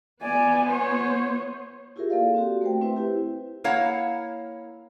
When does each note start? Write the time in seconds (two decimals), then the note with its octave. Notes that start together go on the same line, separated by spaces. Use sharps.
0.22 B3 D5 G#5
0.68 C5 C#5
1.96 E4 F4 G4 G#4 A#4 E5
2.10 A#3 A4 A#4 D5 F5
2.34 C4 F#4 G4
2.61 A3 A#4 C5 G5
2.81 A3 C4 E4 B4 C5 E5
2.96 E4 G4
3.64 A#3 E4 C#5 F5 F#5